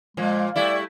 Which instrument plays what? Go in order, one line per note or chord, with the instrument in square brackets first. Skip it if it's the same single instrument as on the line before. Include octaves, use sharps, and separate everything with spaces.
[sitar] A#2 F3 [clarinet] G#3
[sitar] G3 A3 E4 [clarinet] D5